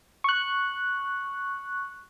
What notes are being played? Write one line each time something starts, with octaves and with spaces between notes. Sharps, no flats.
C#6 F#6